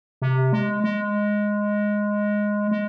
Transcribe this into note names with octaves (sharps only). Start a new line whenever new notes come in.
C3
G#3
G#3
G#3